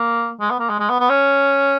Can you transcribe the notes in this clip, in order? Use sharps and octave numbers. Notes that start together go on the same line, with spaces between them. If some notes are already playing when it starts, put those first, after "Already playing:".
Already playing: A#3
G#3
B3
A#3
G#3
G#3
B3
B3
C#4